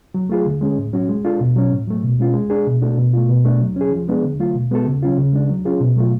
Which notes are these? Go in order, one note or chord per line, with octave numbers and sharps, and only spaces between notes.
F#3
A3 F4 G#4
D3
G#3 C#4 G#4
A2
F#3 C#4 F#4
G#3
D4 F4 A4
B2
F#3 C#4
A2
F#3 A3
B2
G#3 C#4 F4
G#3
D4 G#4
B2
A3 D4 F#4 A4
B2
A3 F4
B2
A3 D4
F#3
C#4 G#4
F3
G#3 B3 D4 G#4
D3
F#3 A3 F4
B2
G#3 B3 F#4 A4
C#3
F#3 C#4 F4
C#3
G#3 D4
F#3
C#4 F4 G#4
B2
F#3 A3 F4